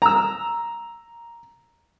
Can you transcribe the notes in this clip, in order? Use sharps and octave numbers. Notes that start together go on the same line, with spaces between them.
A#5 E6